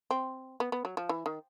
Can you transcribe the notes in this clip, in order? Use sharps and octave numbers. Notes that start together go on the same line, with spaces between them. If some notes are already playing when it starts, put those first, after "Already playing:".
C4
B3
B3
F#3
F3
E3
D#3